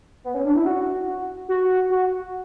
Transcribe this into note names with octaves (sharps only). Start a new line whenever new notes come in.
B3
C#4
D4
E4
F#4
F#4
F#4